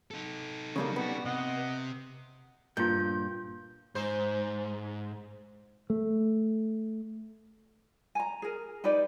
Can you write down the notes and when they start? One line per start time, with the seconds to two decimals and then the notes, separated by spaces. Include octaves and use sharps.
0.11 D#4 A4
0.76 C#3 G3 A#3
0.96 G3 B3 F#4
1.25 C3 D#5 F#5
2.77 G2 A#2 F4 G6
3.95 G#2 C5
5.90 A3
8.15 G#5 A#5
8.42 G#4 A#4
8.84 D#4 G4 B4 D5